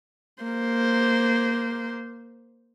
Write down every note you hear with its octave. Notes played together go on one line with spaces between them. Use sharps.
A#3 C5